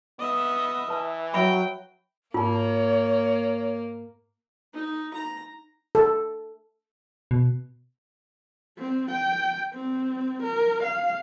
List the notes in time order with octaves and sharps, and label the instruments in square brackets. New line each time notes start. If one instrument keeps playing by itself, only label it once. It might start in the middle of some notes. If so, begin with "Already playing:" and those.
[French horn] B3 [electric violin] D#5 E5
[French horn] E3 [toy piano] B4 A5
[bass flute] F#3 [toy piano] E5 B5 [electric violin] G5
[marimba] G#2 A5 [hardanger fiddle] A#3 [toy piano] F4 [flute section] C#5
[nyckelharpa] D#4
A#5
[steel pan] A4
[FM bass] B2
[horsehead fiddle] C4
G5
C4
A#4
F5